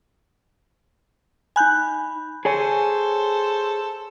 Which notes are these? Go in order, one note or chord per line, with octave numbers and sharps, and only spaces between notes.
D#4 G#5 B5 F#6 G6
G#4 A4 C5 C#5 G#5